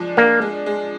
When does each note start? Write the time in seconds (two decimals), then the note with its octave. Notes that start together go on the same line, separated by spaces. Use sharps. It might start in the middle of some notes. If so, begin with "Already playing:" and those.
Already playing: F3 G#3 D4
0.17 A#3 D4
0.42 G#3
0.66 G#3